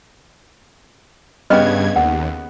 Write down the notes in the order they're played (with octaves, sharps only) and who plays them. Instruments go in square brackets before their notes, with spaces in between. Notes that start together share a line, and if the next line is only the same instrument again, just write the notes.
[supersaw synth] G2 G#6 [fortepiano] C#3 B3 F6 [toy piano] D#5 G5
[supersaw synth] D#2 [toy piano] F#5